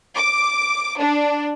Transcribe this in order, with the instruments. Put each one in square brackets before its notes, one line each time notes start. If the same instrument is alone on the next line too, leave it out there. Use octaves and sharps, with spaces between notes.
[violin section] D6
D4